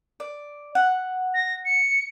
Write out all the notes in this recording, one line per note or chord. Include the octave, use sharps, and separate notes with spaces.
D5
F#5
A#6
C#7